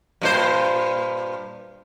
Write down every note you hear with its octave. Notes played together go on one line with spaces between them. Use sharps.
G2 A#2 C5